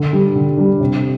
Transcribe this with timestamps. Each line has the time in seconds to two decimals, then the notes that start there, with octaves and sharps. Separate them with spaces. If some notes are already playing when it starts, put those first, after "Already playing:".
Already playing: D3
0.13 G3 D4
0.35 D3
0.57 G3 D4
0.80 C3